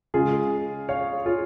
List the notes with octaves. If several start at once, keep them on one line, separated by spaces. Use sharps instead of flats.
C#3 G#3 C#4 F4 G#4
C#5 F5
F4 G#4